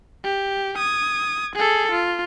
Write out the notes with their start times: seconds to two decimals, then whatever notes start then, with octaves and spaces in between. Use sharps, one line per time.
0.24 G4
0.77 D#6 G#6
1.55 G#4 A4
1.91 F4